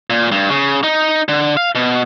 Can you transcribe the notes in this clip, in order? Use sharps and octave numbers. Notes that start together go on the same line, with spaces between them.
A#2
G2
C#3
D#4
D3
F5
B2